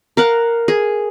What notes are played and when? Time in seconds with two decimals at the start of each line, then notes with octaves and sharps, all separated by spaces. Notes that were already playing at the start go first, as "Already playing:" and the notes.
0.17 A#4 F5 F#5
0.68 G#4